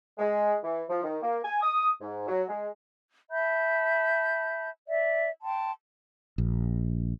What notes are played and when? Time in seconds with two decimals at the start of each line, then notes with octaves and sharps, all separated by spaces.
0.18 G#3
0.63 E3
0.89 F3
1.03 D#3
1.22 A#3
1.44 G#5
1.62 D#6
2.00 G#2
2.28 F#3
2.48 G#3
3.31 E5 A5 B5 G6
4.87 D5 E5
5.43 G5 A5 C6
6.38 A#1